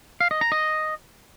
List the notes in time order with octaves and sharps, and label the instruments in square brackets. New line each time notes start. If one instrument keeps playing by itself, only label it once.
[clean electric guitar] F5
D#5
A#5
D#5